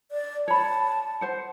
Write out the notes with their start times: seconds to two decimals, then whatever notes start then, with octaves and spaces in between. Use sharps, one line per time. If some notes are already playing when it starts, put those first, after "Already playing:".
0.12 D5
0.48 C#5 A5 B5
1.21 C5 F#5